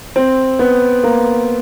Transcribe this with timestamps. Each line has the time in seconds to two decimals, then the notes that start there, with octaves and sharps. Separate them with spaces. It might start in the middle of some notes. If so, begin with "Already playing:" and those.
0.16 C4
0.59 B3
1.03 A#3